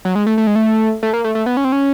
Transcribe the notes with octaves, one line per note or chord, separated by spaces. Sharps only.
F#3
G#3
A3
A3
G#3
A3
A3
A#3
A3
A3
B3
C#4
C4
C#4